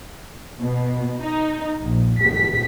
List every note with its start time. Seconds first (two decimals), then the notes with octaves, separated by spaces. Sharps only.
0.60 B2
1.21 D#4
1.82 A#1
2.19 B6